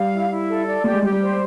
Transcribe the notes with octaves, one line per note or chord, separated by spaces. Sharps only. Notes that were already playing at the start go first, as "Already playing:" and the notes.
Already playing: G3 F5
E4
E4
A4
D5
A3 G4
G#3
G3 G4
G3
C5